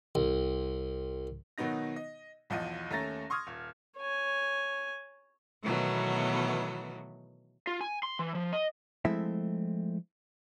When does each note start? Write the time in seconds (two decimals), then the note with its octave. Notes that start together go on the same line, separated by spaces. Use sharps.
0.15 C2
1.58 B2 D#3 F#3 B3 D#4 A#6
1.96 D#5
2.50 B1 E2 F3 D#5 D#7
2.91 D#2 A3 C#4 A#5 A6 A#6
3.30 C6 C#6 D#6 F6 G#6
3.47 D#1
3.97 C#5 G#5
5.62 B2 D#3 E3 F#3 A3 B3
7.67 F4
7.81 G#5
8.03 C6
8.19 E3
8.35 F3
8.53 D#5
9.05 F3 G#3 A3 C4 E4 E5